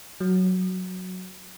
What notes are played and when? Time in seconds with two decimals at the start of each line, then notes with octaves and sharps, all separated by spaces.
0.20 F#3